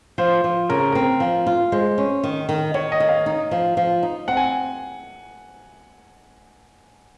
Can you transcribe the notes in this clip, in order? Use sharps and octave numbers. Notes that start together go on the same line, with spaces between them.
F3 C5
F3
C#3 A#4
C4 A#4
F3
F4
G#3 C5
C#4
D#3
D#3
D#3 C#5
D#5
D#3
F5
D#4
F3
F3
D#4
C4 F#5
G#5